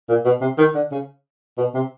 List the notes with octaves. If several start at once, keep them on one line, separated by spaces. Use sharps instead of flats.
A#2
B2
C3
D#3
D3
C#3
B2
C3